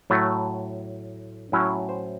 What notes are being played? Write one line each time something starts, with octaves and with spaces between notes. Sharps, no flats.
A2 F#3 A3
A2 F#3 C#4 E4 C#5
C5